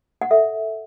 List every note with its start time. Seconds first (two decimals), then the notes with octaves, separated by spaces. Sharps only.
0.22 F#5
0.31 A4 E5